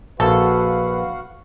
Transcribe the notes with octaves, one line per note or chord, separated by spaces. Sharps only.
A#1 F#4 A4 B4 F5 F#5 A5